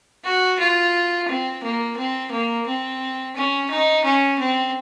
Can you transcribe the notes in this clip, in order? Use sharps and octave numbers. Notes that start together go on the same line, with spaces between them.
F#4
F4
C4
A#3
C4
A#3
C4
C#4
D#4
C#4
C4